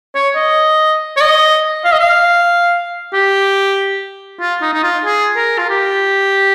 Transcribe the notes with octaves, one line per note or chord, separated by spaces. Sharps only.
C#5
D#5
C#5
D#5
F5
D#5
F5
G4
F4
D#4
D#4
F4
G#4
A#4
F4
G4